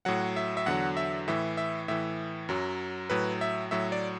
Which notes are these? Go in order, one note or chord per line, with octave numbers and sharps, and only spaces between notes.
A2 F#3 F#5
E5
E5
E2 D3 F#3 F#5
E5
A2 E3 E5
E5
A2 E3 E5
F#2 F#3
A2 F#3 B4
E5
A2 F#3 E5
D5